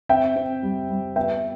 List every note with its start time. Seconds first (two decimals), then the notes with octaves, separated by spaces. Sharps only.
0.09 C4 E5 G5
0.36 C4
0.63 G3
0.89 G3
1.16 B3 E5 G5